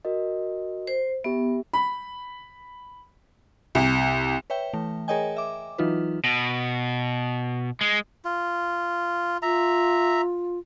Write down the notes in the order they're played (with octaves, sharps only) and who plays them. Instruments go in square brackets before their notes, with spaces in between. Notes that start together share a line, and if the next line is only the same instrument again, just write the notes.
[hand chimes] F#4 A#4 D#5
[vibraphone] C5
[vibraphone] B3 [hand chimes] G4 E5
[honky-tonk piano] B5
C2
[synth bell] B4 C#5 E5 G5
E3 A3
G#4 A#4 C#5 D#5 G5 G#5
E5 D6
E3 F#3 D#4 F4 B4
[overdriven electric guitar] B2
G#3
[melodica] F4
[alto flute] F4 [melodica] E5 A#5